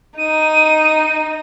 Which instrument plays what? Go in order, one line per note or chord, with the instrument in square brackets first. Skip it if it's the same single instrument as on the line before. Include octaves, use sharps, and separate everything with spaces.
[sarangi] D#4 [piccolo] D#7